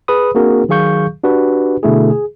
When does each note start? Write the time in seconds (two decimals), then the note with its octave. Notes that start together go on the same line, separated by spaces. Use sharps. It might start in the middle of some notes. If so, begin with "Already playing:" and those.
0.08 G#4 B4 B5 D#6
0.35 A#3 C4 D4 F#4 G#4 A#4
0.69 D#3 F#3 G#4 F5 C#6 G6
1.23 D4 F#4 G4 B4
1.83 B2 D3 A3 E4 G#4
2.10 G#4